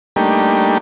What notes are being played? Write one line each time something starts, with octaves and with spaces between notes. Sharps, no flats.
G3 A3 A#3 D4 D#4 G4